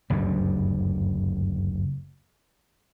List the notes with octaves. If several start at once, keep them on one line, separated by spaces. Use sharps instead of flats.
F#1 D2 G2